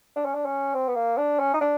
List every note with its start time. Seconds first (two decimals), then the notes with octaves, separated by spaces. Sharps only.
0.16 D4
0.25 C#4
0.35 D4
0.45 C#4
0.74 C4
0.88 B3
0.96 A#3
1.17 D4
1.39 C#4
1.54 D#4
1.61 D4